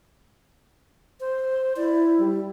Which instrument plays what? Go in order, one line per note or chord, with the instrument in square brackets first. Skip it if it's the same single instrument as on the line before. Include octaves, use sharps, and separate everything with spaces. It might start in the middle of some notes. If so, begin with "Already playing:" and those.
[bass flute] C5
[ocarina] E4 [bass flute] D5
[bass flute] G3